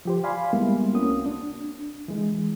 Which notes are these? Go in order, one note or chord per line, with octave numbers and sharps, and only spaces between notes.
F3 G4 C5
D5 F5 G#5 B5 C6
G3 G#3 A#3 B3 E4
C2 A#3 C4 C#4 F#4 D#6
D4
E3 G#3